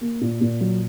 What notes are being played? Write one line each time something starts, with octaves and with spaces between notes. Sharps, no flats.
A#3
A#2
A#2
F#3